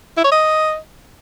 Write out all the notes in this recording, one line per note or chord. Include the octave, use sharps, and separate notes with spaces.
E4
C#5
D#5